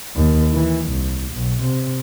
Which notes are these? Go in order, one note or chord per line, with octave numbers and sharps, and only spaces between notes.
D#2
E3
C2
B1
C3